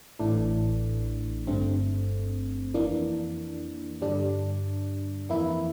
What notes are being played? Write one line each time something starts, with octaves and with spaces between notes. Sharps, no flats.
A1 A2 E3 A3 D4
G1 G2 D3 A3 C4
F2 E3 A#3 D4
G2 D3 G3 D4
F2 E3 A#3 E4